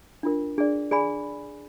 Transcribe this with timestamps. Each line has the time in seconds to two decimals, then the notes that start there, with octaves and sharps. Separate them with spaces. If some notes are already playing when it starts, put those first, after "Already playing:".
0.23 D4 F4 A#4
0.58 D4 G#4 D5
0.91 G#4 D5 G#5 B5